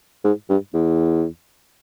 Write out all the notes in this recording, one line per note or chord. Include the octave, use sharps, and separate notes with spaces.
G#2
G2
E2